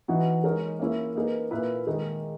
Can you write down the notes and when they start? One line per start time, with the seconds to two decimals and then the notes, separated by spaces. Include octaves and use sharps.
0.08 E3 B3 D#4 F#4
0.44 G#3 D#4 A#4 C#5
0.79 A#3 C#4 E4
1.15 A#3 D#4 G#4 B4
1.51 A#2 A#3 E4 B4
1.87 D#3 G#3 D#4